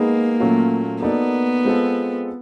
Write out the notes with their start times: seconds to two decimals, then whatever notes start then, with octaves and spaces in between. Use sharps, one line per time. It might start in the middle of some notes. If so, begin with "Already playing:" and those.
Already playing: G#3 A#3 B3 D#4 G#4
0.40 A#2 F#3 A3 C#4 F4
1.02 A#3 B3 D#4 F#4 A4 D5
1.65 G#3 C4 F4 A4